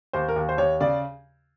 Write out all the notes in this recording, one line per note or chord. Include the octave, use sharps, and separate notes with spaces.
D#2 C5
A#4
D#2
C5
D#2 C#5
C#3 D5